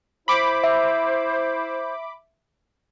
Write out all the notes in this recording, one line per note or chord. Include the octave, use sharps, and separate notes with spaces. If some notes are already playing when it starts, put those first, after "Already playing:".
E4 C5 B5 D6
E5